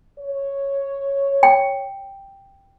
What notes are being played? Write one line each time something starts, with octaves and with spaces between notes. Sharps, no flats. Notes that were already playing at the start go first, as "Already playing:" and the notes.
C#5
G5